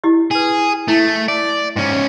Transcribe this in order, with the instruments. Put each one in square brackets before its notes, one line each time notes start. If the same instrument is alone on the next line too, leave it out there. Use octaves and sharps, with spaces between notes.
[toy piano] E4 G4 D#5
[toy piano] E4 B4 [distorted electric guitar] G#4
[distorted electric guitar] A3 [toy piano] E4
[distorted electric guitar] D5
G#2 C#4